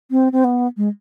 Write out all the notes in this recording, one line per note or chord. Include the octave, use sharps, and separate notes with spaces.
C4
C4
B3
G#3